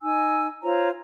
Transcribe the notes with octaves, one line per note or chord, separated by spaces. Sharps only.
D#4 G#5 E6
F4 C5 C#5 A#5